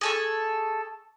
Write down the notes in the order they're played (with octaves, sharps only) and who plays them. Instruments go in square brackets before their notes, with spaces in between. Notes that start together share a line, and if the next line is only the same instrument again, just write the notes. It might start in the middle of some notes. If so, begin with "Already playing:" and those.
[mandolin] G#4 A4 C#6